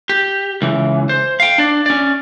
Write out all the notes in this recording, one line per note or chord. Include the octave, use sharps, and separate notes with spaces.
G4
C#2 E3
C5
F5 G5
D4 D5
C#4 D5